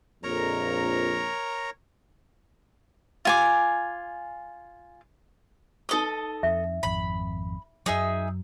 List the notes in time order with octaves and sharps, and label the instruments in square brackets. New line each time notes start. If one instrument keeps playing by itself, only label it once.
[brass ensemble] A#1 F2 [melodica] A#4 C#5 A#5
[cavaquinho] F4 G#5 D6
[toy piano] D#4 B4 D#6 [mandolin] A4 D#5
[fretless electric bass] F2 [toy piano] E5
[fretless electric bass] G#1 F2 [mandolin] B5
[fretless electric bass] F#2 F#3 [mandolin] D#4 G#4 E5